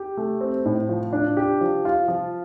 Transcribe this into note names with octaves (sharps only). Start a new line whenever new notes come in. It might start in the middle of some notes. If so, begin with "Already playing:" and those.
Already playing: G4
A3
C4
A2
F3
D4
G4
F3
F4
F3